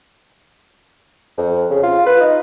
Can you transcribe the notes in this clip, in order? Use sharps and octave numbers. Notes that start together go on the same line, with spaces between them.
F2
C#3
F4
B4
D#4